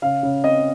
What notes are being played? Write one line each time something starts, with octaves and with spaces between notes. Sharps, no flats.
C#3 F5
C#3
C4 D#5